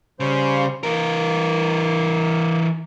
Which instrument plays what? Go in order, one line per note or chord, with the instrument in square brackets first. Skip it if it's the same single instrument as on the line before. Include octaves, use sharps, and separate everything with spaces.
[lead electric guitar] C#3 [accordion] G3 C5
[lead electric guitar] E3 A#4 [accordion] A#3